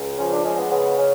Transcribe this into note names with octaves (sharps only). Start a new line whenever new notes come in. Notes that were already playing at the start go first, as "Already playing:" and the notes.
Already playing: C#2
F3 C#4
D4
G#3 C#4
B3
C#3 B3
C#4